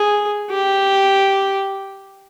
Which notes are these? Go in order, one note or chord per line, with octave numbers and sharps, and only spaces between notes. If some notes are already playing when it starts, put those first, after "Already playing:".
Already playing: G#4
G4